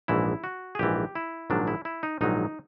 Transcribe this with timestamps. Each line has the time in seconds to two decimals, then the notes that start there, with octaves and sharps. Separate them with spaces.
0.08 A#1 G#2 E3 E4
0.44 F#4
0.75 G#4
0.79 A#1 G#2 E3 G4
1.15 E4
1.50 A#1 G#2 D#3 F#3 D4
1.67 E4
1.85 E4
2.03 D#4
2.21 A#1 G#2 D#3 F#3 D#4